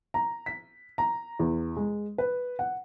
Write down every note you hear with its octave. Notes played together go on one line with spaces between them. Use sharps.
A#5
B6
A#5
E2
G#3
B4
F#5